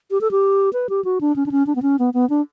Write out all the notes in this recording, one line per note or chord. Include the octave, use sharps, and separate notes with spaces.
G4
A4
G4
B4
G4
F#4
D4
C#4
D4
C#4
D4
B3
C#4
B3
B3
D4